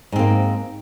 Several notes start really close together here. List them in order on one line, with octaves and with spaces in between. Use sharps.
G#2 C4 A#3